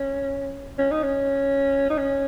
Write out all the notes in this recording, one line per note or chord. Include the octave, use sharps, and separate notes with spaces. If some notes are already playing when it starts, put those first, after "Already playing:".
Already playing: C#4
C#4
D#4
C#4
D#4
C#4